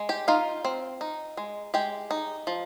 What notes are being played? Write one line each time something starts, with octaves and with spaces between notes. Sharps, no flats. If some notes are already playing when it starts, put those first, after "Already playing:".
Already playing: G#3
G4 G5
D#4 F4 F5
C4
D#4
G#3
G#3 G4 G5
D#4
F3